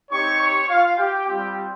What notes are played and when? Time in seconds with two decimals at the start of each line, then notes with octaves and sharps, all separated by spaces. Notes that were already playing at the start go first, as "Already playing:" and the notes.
0.11 C4 D#4 G4 C#5 C#6
0.40 C#5 C#6
0.69 F4 F5
0.98 G4 G5
1.26 G3 C4 F4 G4 G5